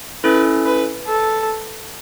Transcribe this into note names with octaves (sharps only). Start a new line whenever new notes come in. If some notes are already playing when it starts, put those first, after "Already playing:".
C#4 E4 A4 B4
B4
A4